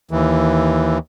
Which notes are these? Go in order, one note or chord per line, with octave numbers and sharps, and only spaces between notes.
D#2 E3